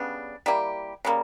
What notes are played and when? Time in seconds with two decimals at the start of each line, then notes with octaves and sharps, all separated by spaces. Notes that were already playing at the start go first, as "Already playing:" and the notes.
Already playing: C#3 G3 B3 D4
0.46 G3 A#3 E4 G4
1.05 C#3 G3 A#3